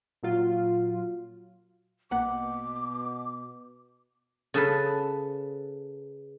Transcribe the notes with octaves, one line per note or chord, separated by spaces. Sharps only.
A#2 F#3 F4
A#1 B2 A#3 F#5 D6
C#3 A4 B4